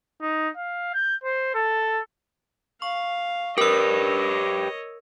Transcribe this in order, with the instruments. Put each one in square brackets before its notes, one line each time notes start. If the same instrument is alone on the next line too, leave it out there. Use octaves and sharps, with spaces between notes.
[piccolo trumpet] D#4
F5
G6
C5
A4
[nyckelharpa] F5 [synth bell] C#6
[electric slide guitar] G4 B4 [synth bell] A#4 E6 [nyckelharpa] C#5 D#5